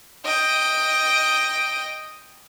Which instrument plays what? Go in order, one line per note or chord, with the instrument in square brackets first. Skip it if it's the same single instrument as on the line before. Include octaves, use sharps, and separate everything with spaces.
[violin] D#5 G5